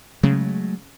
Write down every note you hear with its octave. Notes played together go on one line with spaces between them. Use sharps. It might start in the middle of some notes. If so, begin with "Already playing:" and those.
C#3 F#3 G#3 A3